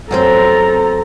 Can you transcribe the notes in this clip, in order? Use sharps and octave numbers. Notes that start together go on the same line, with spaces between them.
F#2 C4 A4 C5 A#5